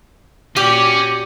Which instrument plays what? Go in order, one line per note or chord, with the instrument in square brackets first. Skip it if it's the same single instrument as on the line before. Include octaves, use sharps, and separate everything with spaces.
[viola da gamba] A#2 F#4 D5 [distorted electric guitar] C#4 [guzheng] G4